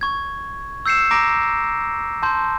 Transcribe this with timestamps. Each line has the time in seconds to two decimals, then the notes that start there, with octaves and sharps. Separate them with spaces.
0.01 C#6 G#6
0.86 E6 G6 C7 C#7 E7
1.11 A#5 D6 A#6 D7
2.23 A5 C6 G6